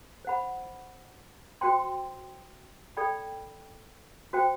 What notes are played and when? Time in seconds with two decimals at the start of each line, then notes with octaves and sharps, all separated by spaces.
0.25 C5 F#5 B5
1.61 F#4 C5 G5 C6
2.97 A4 D5 G5 B5
4.33 F#4 C5 G5